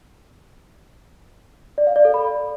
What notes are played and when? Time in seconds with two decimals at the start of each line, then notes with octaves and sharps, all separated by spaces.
1.78 D5
1.87 F5
1.96 D5
2.05 A4
2.14 B5